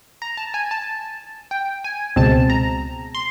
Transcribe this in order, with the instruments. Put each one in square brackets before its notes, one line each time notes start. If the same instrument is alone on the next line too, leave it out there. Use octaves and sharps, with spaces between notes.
[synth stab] A#5
A5
G#5
A5
G5
G#5
C#2 B2 G#3 C4 A5
A#5
C6